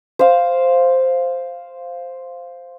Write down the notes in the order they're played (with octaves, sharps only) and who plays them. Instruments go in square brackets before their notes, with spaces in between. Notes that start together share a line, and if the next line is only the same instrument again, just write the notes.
[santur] C5 F5